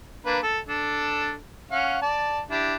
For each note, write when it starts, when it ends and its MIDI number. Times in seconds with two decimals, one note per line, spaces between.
0.26 0.39 58
0.26 0.39 62
0.26 0.39 71
0.43 0.59 69
0.68 1.36 62
0.68 1.36 69
1.71 1.97 61
1.71 1.97 77
1.71 1.97 78
2.02 2.41 74
2.02 2.41 81
2.51 2.76 62
2.51 2.76 64
2.51 2.76 67